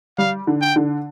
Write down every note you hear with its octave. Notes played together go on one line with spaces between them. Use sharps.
G3 F5
D3
G5
D3